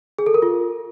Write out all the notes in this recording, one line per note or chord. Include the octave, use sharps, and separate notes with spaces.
G#4
A4
A#4
F4